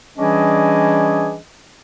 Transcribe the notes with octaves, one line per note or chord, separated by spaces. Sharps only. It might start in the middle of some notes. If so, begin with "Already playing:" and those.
E3 G3 C#4 D4 G#4 D#5